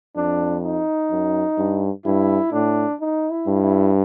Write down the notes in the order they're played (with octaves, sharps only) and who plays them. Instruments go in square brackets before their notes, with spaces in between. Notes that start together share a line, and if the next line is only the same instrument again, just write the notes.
[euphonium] F2 [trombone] D4
[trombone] D#4
[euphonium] F#2
G2
[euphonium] G2 [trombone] E4
[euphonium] A2 [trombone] D4
[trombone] D#4
E4
[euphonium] G2
[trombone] E4